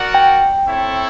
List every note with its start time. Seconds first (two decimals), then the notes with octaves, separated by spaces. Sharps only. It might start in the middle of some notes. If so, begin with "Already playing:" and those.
Already playing: F#4 A#4 D5 F#5
0.14 G5
0.66 C4 E4 A4 C#5 E5